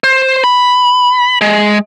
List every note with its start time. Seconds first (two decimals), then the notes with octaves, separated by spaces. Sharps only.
0.04 C5
0.44 B5
1.41 G#3